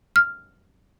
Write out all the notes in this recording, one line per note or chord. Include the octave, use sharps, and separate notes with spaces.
F6